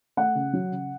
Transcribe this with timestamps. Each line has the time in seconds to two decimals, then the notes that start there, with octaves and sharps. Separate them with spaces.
0.17 A3 F#5
0.35 C#3
0.53 F#3
0.72 C#3